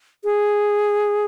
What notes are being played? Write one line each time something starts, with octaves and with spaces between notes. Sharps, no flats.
G#4